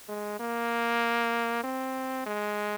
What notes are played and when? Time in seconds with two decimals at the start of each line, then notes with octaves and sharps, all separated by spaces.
0.09 G#3
0.40 A#3
1.64 C4
2.26 G#3